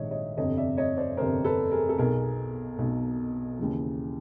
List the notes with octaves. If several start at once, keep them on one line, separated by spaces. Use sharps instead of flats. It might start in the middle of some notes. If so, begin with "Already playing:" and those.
Already playing: A#1 G#2 D#3 C#5 D#5 E5
C#5 D#5
G1 F2 C3 C#5 D#5
D5 E5
C#5 D#5
C5 D5
G1 F2 C3 A#4 C5
A4 B4
G#4 A#4
A4
B1 B2 G#4 A#4
B1 B2
D#2 C#3 E3